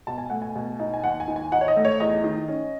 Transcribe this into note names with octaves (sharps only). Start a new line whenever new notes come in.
B2 A5
G#5
A3 F#5
G#5
B2
D#4
G#5
D#2 F#5
G#5
D#3
G#5
D#4 F#5
C#5
D#5
A3
C#5
E2 D#5
D#3
C#4